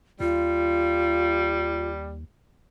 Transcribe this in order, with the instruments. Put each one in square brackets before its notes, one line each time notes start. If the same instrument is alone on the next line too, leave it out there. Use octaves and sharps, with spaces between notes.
[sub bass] D#2 [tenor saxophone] G3 [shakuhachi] F4